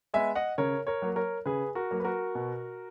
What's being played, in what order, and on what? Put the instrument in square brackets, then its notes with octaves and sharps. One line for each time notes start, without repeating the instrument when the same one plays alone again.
[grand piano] G#3 B3 E5 G#5
D#5 F#5
C#3 A#4 C#5
A#4 C#5
F#3 A#3
A#4 C#5
C#3 G#4 B4
F#4 A#4
F#3 A#3
B4
F#4 A#4
B2